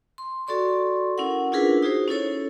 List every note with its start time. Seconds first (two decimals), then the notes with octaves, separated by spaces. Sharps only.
0.18 C6
0.47 F#4 A4 D5 C6 C#6
1.18 C#4 E4 A#4 F#5
1.52 D4 E4 F4 G#4 A#4 B4
1.83 D#4 F#4 G#4 C5
2.08 C#4 E4 A4 C#5